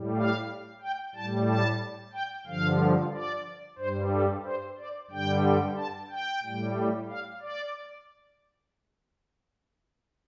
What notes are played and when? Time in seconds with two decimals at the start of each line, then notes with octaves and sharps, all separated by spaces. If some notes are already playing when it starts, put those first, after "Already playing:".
Already playing: A2 G3
0.16 F5
0.82 G5
1.15 A2 G3 A5
1.47 A5
2.13 G5
2.47 G2 D3 F3 F5
3.12 D5
3.79 G2 G3 C5
4.12 A4
4.45 C5
4.78 D5
5.10 G2 D3 G3 G5
5.77 A5
6.10 G5
6.43 A2 G3
7.09 F5
7.42 D5